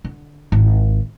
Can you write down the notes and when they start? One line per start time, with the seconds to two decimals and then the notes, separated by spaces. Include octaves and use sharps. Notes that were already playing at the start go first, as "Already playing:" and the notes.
0.04 D3
0.52 G#1 E4